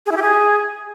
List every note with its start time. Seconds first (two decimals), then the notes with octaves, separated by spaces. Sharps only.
0.06 G#4
0.11 E4
0.17 G4
0.22 G#4